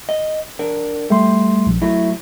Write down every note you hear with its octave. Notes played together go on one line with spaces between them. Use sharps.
D#5
D4 A#4
G3 A3 C6
A#1
F#3 A3 E4